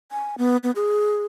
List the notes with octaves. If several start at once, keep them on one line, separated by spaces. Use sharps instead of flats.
G#5
B3
B3
G#4